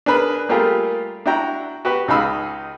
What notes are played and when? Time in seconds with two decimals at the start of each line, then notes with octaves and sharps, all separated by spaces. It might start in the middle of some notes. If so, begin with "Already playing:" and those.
0.06 D4 G#4 A#4 B4 B5
0.49 G3 A3 A#3 F4 G4 G#4
1.26 D4 E4 F#4 G5 A#5
1.85 F#4 G4 B4
2.08 C#2 D#4 G#4 F5 B5 E6